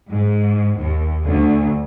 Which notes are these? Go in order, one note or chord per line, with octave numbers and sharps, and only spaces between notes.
G#2
D#2
D2